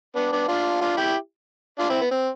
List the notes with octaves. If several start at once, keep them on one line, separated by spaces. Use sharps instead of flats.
B3 D4
B3 D4
D4 F4
D4 F4
E4 G4
D4 F4
C4 E4
B3
C4